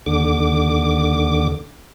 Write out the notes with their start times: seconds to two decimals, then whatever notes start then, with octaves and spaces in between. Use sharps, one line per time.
0.06 D#2 D3 D6